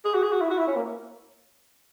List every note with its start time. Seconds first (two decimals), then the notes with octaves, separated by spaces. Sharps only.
0.05 G#4
0.14 F#4
0.23 G#4
0.32 F#4
0.41 E4
0.50 F#4
0.58 E4
0.67 C#4
0.77 A#3